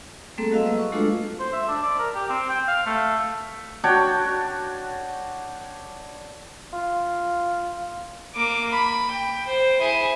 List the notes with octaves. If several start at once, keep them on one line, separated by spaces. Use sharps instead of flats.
G3 A3 A#3 C4 G#4 A4
F#3 F#4 D#5 F5 E6
B4 D#5
C#6
G#3 A3 D4 F4 F#4 A4
C5
E5
D4
D5
A#4
G4
C4
G5
F5
A3
D4 F#4 C#5 G5
F4
A#3 D6
B5
G5
C5
E4 G#4